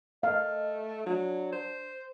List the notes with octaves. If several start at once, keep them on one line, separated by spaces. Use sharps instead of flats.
A3 D#5 F5
F#3 D4
C5